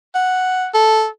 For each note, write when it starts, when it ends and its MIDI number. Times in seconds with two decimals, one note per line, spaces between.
0.15 0.67 78
0.74 1.07 69